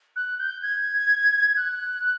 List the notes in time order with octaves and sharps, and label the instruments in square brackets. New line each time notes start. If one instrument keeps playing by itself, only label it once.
[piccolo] F#6
G6
G#6
F#6